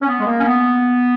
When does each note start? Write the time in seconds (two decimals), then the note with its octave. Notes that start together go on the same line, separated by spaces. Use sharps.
0.02 C#4
0.08 B3
0.19 G#3
0.27 A#3
0.40 C#4
0.46 B3